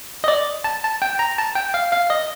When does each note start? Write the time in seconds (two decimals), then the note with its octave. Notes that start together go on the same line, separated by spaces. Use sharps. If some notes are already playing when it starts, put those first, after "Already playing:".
0.24 D#5
0.28 D5
0.64 A5
0.84 A5
1.02 G5
1.19 A#5
1.38 A5
1.55 G5
1.74 F5
1.93 F5
2.10 D#5